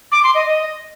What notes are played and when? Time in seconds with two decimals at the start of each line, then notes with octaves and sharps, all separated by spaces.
0.12 D6
0.23 C6
0.35 D#5
0.46 D#5